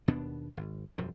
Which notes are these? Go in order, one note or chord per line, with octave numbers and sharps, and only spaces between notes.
D#2 B2 B3 D4
G#1
E1 F#2 F3